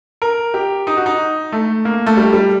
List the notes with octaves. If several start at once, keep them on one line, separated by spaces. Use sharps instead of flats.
A#4
G4
D#4
F#4
D#4
A3
A#3
A3
G3
G3